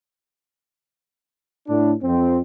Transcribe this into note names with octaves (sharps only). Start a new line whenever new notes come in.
A2 D4
F2 C4